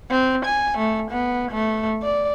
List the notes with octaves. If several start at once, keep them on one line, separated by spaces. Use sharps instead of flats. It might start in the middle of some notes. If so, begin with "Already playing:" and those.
C4
G#5
A3
B3
A3
D5